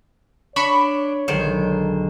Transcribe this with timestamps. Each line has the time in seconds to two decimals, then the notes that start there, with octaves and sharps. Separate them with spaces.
0.56 D4 C#5 B5 C#6
1.28 B1 D3 D#3 G#3 C5